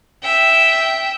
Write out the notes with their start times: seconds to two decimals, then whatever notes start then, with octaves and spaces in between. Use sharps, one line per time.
0.23 E5 G5